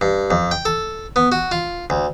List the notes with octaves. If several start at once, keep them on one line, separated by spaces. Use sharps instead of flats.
G2
F2
G5
A4
B3
F#4
F4
D2